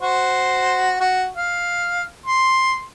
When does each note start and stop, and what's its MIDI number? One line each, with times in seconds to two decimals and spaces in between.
0.01 0.97 66
0.01 0.97 72
1.00 1.27 66
1.36 2.04 77
2.26 2.81 84